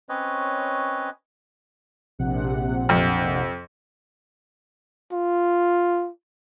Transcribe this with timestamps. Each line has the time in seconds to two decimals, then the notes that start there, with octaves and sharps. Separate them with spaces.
0.09 C4 C#4 B4 C#5 D#5
2.19 A#1 C3 F#5
2.89 F2
5.12 F4